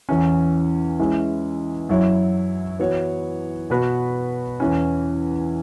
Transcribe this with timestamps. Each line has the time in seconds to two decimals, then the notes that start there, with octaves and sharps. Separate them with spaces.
0.09 E2 E3 C#4
0.99 E3 G#3 C#4 E4
1.89 F#2 F#3 E4 C#5
2.79 E3 B3 F#4 C#5
3.70 B2 B3 F#4 B4
4.60 E2 E3 C#4